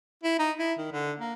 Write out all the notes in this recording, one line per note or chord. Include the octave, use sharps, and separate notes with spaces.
E4
D#4
E4
D#3
D3
A#3